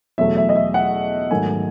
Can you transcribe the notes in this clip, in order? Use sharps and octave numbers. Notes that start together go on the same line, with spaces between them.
E2 B2 F#3 A3 E5
E5
D#5
E5
F#5
G#2 D#3 F#3 A3 G#5